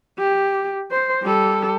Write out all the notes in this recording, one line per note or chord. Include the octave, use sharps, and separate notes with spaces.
G4
C5
G3 A4